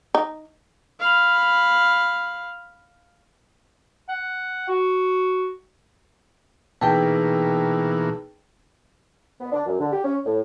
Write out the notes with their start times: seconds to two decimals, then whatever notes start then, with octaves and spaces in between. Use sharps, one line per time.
0.15 D#4
1.00 F5 B5
4.09 F#5
4.68 F#4
6.81 B2 E3 A#3 D#4 G#4 B4 G5 A5
9.40 B3
9.52 D4
9.66 F#2
9.80 D3
9.92 G4
10.04 C#4
10.25 A2